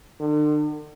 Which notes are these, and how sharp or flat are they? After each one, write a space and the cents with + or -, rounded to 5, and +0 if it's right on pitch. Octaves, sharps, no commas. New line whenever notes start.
D3 +40